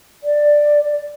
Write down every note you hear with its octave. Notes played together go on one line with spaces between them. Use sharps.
D5